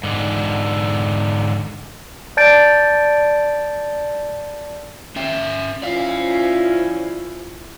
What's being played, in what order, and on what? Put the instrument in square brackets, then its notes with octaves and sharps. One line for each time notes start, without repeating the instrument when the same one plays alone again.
[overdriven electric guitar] G#2 D3
[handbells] D5 A5 G6 A6 D7
[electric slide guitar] C#4 E5 G5
[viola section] F3 C#4 E4 [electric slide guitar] D5 F5